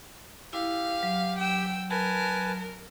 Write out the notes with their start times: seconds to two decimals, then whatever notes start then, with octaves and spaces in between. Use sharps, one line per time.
0.53 E4 G4 F5
1.03 F#3
1.39 G5 E6
1.90 A#4 B4 G#5 A5